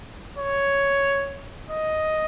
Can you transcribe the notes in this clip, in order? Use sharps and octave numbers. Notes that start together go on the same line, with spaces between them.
C#5
D#5